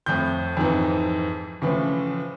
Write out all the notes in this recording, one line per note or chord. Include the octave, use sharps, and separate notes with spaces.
F2 A2 G6
F2 G#2 E3
A2 C#3 E3 F3